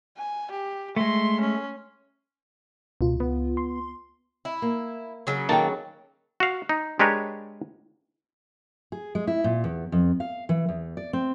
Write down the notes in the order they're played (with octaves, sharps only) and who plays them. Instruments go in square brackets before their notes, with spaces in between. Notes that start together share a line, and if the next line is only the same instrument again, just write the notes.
[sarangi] G#5
G4
[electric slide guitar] G#3 A3 [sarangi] C6
[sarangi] C#4
[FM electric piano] C#2 F4 [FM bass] B2
[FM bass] B3
[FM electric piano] C6
[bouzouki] E4
[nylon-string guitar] A#3
[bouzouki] C#3 F#3
[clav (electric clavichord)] D#3 A#3 A5 [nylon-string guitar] A4 F#5 G5
[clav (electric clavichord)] F#4 F5
D#4
G#3 D4 G4 A#4 B4 C#5
[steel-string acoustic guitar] G#4
G#3
E4
A#2
E2
F2
F5
E3
E2
D5
C4